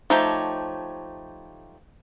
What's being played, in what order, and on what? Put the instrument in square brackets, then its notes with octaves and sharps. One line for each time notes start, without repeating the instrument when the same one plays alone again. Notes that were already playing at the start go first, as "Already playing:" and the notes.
[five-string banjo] F3 A3 G4 [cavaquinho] D#4 C#5